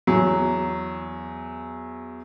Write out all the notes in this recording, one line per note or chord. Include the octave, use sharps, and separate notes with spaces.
E2 F#3